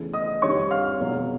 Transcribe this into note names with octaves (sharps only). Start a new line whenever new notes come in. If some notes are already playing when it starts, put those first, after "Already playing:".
Already playing: E2 C#3 E3 A3
D#5 D#6
F2 C3 D#3 G3 C#5 C#6
F5 F6
E1 E2 B2 F#3